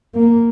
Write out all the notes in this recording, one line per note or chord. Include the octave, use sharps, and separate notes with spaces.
A#3